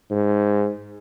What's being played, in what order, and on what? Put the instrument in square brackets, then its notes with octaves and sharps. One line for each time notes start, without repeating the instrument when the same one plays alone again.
[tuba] G#2